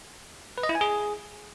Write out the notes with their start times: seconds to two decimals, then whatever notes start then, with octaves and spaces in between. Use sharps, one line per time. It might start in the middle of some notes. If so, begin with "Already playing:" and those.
0.58 B4
0.63 D#5
0.69 E4
0.75 G#5
0.81 G#4